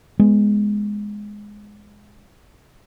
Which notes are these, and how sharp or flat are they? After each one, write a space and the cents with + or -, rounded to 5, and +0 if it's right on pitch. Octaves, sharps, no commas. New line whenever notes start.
G#3 +0 B3 +0